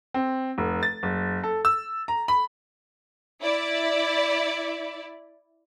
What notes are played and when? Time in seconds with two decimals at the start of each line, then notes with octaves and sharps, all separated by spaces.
0.14 C4
0.58 F1
0.83 A6
1.03 F#1
1.43 A4
1.65 E6
2.08 A#5
2.28 B5
3.41 E4 D5